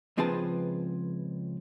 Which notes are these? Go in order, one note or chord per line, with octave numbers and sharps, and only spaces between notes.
C#2 F3 C4 G#4 B4 A5